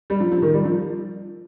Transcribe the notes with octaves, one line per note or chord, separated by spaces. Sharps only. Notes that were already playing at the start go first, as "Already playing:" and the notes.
G3
F3
F3
D#3
G3
F3